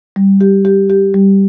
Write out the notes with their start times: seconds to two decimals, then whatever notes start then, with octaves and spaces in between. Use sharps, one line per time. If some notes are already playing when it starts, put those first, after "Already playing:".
0.16 G3
0.41 G4
0.65 G4
0.90 G4
1.14 G3